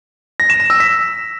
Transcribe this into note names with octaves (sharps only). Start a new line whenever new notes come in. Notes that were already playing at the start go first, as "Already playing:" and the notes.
A#6
E7
E7
E6
B6